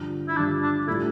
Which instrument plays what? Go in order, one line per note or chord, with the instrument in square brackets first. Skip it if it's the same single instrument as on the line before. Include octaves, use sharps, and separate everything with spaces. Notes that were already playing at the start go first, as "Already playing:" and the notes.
Already playing: [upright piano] G2 D3 F3
[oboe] E4
[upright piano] G2 D3 F3 [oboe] D4
[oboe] D4
[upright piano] A2 G3 D4 F4 A4 [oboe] E4